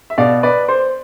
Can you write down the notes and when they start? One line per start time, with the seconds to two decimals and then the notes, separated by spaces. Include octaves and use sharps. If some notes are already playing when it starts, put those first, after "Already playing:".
0.10 E5
0.18 B2 D5 F5
0.43 B4 D5
0.68 C5